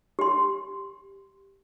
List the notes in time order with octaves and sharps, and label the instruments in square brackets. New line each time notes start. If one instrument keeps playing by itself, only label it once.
[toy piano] G4 C6